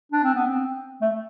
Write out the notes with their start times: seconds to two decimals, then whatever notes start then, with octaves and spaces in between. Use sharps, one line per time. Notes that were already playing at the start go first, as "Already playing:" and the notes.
0.12 D4
0.24 C4
0.35 B3
0.47 C4
1.02 A3